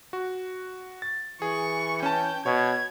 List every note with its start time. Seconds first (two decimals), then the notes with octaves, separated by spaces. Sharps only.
0.13 F#4
1.02 A6
1.42 E3 G#4 C#6
2.03 C#4 G5 A5
2.46 B2 C#5 G#6